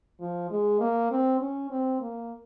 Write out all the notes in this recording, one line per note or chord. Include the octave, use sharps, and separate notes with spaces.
F3
G#3
A#3
C4
C#4
C4
A#3